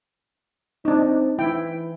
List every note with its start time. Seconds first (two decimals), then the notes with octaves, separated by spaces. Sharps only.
0.85 C4 D4 D#4
1.39 E3 E4 G5